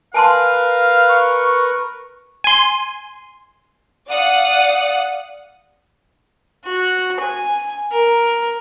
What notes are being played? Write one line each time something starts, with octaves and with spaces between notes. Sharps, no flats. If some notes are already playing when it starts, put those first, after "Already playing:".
A#4 B4 F5 G#5 A5 C6
C#6
G#5 C6
D5 F5 F#5 D#6
F#4
G#5
A#4